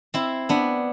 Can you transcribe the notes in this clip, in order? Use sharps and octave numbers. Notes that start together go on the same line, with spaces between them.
C4 E4
B3 D4